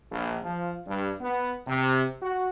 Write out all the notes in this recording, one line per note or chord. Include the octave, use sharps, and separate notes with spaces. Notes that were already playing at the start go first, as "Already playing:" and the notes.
A#1
F3
G2
B3
C3
F#4